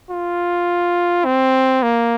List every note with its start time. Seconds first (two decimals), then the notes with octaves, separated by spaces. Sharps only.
0.10 F4
1.25 C4
1.83 A#3